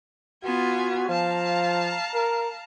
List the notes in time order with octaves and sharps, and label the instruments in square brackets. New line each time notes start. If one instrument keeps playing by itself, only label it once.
[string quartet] B3 F4 G#5 [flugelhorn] F#4
[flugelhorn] F3 [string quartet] F5 A5 A#5
[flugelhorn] A#4